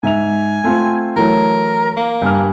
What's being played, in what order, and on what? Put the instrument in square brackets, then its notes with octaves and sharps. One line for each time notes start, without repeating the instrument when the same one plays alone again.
[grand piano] G#2 E5 F7 [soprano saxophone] G#5
[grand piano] A3 C4 F4
[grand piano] E3 F#3 A3 [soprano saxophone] A#4
[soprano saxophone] A#3
[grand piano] G2 G#5 F6